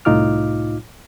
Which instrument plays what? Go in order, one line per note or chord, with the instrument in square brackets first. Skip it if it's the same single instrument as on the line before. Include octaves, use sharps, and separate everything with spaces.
[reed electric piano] C2 A2 D#4 F4 D6 F6